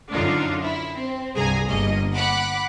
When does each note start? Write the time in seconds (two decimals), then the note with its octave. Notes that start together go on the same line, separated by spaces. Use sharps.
0.12 F#2 D3 D4 D#4 F4
0.63 E4
0.96 C4
1.35 C2 G2 G#4 G#5 A#5
1.68 G1 G2 A#3 D#5
2.14 F#5 B5 D6 F#6